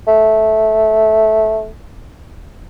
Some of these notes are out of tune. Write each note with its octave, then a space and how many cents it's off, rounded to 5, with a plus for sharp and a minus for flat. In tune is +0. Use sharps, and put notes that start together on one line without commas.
A3 -10